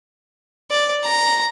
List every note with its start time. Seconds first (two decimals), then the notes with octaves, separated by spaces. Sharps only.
0.71 D5
1.04 A#5